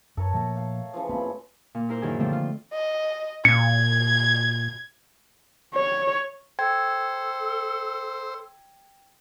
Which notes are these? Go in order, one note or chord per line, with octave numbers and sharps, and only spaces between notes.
F#2 A4 A#4 C#5
A#2 F3 A3 A#3 A4
F5 G5
C#3 E3 F3
F#2 A#3 C4 B5
A#2
E4 A#4 C5
F#2 D#3 E4 G#4 G#5
D3 D#3 F3 A3 C4
F4
D#5
A#2 G#6 C#7
C#5
A4 C5 G5 G#6